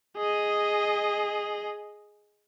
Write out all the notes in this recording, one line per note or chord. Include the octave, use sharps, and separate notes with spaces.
G#4 D#5